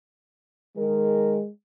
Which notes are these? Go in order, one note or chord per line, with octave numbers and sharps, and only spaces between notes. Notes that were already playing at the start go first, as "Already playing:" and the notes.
D#3 G#3 G#4 A#4